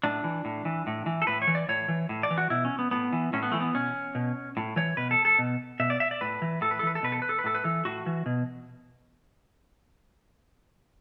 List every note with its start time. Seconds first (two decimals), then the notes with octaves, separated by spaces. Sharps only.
0.03 A2 D4
0.24 E3
0.45 A2
0.65 E3
0.87 A2
1.06 E3
1.22 A4
1.27 A2 B4
1.42 C#5
1.47 E3
1.55 D5
1.69 A2 C#5
1.88 E3
2.09 A2
2.23 D5
2.31 E3
2.38 F#4
2.50 B2 E4
2.65 C#4
2.79 B3
2.91 A2 B3
3.13 E3
3.33 A2 C#4
3.43 B3
3.52 E3 A3
3.60 B3
3.74 B2 C#4
4.15 B2
4.57 A2
4.76 E3 C#5
4.97 B2 B4
5.11 A4
5.25 A4
5.39 B2
5.80 B2 E5
5.90 D5
6.00 E5
6.11 D5
6.21 A2 B4
6.42 E3
6.61 A2 A4
6.71 B4
6.79 A4
6.83 E3 B4
6.95 A4
7.02 B2 B4
7.12 A4
7.22 B4
7.29 A4
7.39 B4
7.44 A2 A4
7.55 B4
7.64 E3 A4
7.85 A2 F#4
8.06 E3
8.26 B2